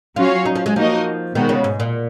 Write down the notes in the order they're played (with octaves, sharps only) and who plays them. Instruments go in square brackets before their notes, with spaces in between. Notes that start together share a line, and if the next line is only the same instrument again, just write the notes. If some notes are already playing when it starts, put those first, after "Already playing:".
[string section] F#3 C#4 F#4 C#5 F5 [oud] F4
[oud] D#4
F3
G#3
[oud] F3 [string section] A#3 D#4 F#4 A#4 D#5
[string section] B2 G#3 B3 F#4 [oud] D#3
[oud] C#3
G#2
A#2